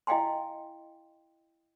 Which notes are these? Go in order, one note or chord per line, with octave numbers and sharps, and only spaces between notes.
E4 D#5 F5 G5 G#5 C6